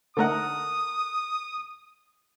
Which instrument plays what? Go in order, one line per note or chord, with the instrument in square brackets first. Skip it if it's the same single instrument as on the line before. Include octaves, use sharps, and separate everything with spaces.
[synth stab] D3 A3 D#4 [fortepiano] A4 A#4 F#5 [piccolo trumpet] D#6